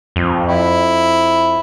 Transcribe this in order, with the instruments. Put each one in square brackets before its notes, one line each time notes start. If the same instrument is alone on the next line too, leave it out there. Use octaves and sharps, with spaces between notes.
[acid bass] F2
[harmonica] E4